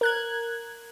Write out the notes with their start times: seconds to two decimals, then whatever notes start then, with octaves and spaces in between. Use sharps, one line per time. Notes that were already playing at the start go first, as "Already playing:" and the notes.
0.01 A#4 F#6 G#6